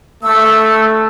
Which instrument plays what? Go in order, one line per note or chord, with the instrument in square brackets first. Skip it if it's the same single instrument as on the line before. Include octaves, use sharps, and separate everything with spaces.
[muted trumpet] A3 [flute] E6